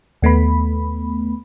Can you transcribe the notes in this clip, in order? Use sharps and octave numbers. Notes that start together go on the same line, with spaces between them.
D#2 A3 B3 B5